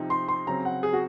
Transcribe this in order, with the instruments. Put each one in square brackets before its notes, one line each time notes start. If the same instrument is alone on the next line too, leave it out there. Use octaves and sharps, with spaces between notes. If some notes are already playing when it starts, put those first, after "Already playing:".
Already playing: [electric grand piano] C3 F3 C4 D#4
[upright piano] C6
C6
[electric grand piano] C#3 F#3 C4 [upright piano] A#5
[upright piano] F#5
G#4
F#4